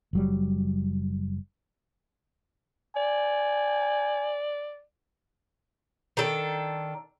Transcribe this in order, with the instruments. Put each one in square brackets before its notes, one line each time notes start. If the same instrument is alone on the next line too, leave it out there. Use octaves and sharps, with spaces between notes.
[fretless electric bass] F#1 F#3 G3
[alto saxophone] D5 [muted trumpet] G#5
[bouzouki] D#3 D4 A4